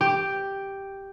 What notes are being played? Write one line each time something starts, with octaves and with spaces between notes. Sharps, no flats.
G4